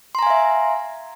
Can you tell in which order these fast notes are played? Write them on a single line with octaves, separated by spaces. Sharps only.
C6 A#5 G#5 F5 E5